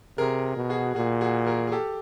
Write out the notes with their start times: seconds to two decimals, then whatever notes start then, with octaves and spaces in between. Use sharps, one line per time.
0.18 C3 G#4 A#4
0.56 B2
0.70 F#4 G#4
0.95 A#2 F#4 G#4
1.21 F#4 G#4
1.47 G#4 A#4
1.67 G#4
1.72 G4 A4